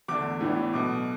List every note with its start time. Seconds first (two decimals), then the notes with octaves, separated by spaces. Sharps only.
0.08 E2 D3 A3 D4 D6
0.41 A2 E3 B3 D4
0.73 B1 B2 A3 D6